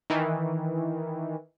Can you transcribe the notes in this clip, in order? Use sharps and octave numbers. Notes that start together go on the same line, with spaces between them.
D#3 E3